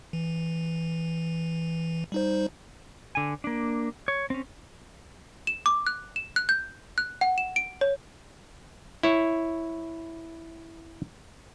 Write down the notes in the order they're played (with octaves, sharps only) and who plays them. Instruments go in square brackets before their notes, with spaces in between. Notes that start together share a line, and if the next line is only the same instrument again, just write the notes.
[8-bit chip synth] E3
G3 D#4 C5
[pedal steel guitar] D3 G#5
A#3 D4
C#5
C4 C#4
[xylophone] E7
D6
F#6
E7
F#6
G6
F#6
F#5
E7
D7
C#5
[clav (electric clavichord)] E4 C#5